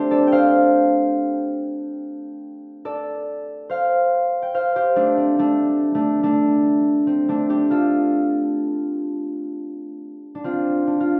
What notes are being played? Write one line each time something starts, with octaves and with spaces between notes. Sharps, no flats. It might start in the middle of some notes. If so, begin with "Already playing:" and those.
Already playing: A3 C4 D4 G4 C5
A4 D5
G5
C5 F5
A4 D5
C5 F5
G5
C5 F5
G4 C5
A3 D4
C4
A3 D4
A3 D4
A3 D4
C4
A3 D4
D4 G4
F4 A4
D4
C4 F4
D4
F4